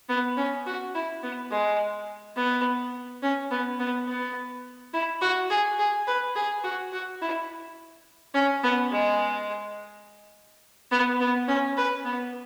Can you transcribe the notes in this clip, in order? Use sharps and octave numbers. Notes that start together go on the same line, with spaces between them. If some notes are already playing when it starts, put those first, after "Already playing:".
B3
C#4
F#4
E4
B3
G#3
B3
C#4
B3
B3
B3
E4
F#4
G#4
G#4
B4
G#4
F#4
F#4
E4
C#4
B3
G#3
B3
B3
C#4
B4
B3